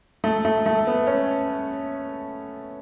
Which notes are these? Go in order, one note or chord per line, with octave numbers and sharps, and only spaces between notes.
A3
A3
A3
B3
C#4